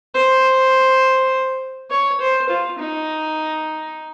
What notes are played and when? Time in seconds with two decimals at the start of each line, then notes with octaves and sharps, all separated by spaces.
0.15 C5
1.91 C#5
2.21 C5
2.49 F4
2.79 D#4